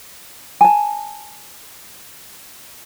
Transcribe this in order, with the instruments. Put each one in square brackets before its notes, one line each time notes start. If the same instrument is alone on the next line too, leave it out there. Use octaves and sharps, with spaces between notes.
[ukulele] G#5 A5